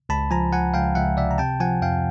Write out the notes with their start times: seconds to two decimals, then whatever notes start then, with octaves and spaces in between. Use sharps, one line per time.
0.09 C#2 A5 B5
0.31 F3 G#5 A#5
0.52 F3 F#5 G#5
0.74 C#2 F5 G5
0.95 C#2 E5 F#5
1.17 C3 D5 E5
1.31 A#5
1.38 C3 G5 A5
1.60 F3 F#5 G#5
1.81 F2 F5 G5